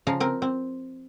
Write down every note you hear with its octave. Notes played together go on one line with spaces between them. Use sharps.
C#3 F3 F5 A#5
C4 A#4
C4